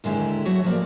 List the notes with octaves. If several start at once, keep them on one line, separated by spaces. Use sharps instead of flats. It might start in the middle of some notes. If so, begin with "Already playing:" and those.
D#2 D3 G#3 E4 G4
F#3 A3 F#4 C#5 E5
F3 A#3 D5